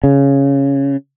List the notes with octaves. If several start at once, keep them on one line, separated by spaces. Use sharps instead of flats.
C#3